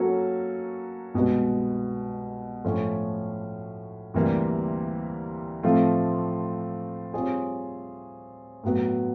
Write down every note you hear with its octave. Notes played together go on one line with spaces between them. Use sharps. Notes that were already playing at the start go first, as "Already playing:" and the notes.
Already playing: F#3 A#3 C#4 F#4 A4
C2 B2 G#3 B3
A2 F3 A3 C#4
D2 C3 E3 G3 A#3
A2 F3 A3 C4 F4
G3 C4 F4 G#4 C#5
A2 F#3 B3